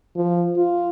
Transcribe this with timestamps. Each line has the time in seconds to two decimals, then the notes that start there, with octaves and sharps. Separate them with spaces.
0.16 F3
0.57 F4